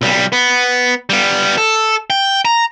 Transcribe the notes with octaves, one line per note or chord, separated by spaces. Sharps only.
B1 G3
B3
G3 B3
A4
G5
A#5